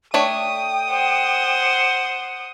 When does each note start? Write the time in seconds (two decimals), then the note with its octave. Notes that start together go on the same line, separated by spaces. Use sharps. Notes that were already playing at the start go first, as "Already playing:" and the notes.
0.14 A3 D4 C#5 G5 D#6
0.91 C5 F#5